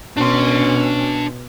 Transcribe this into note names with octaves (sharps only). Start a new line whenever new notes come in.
B2 C#4 D4 C6